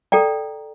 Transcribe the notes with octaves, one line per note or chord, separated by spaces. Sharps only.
A4 D5 G5 A#5